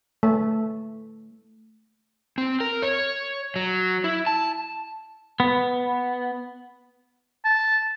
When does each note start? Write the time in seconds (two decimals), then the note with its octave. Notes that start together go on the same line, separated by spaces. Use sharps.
0.23 A3
2.38 C4
2.60 A#4
2.82 C#5
3.56 F#3
4.04 E4
4.27 A5
5.40 B3
7.45 A5